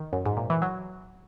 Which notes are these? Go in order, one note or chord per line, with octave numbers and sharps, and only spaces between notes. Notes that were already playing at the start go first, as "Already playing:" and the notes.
Already playing: D#3
F#2
G#2
A#2
E3
F#3